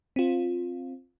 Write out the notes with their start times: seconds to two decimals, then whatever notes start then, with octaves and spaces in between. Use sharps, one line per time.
0.16 C4 F4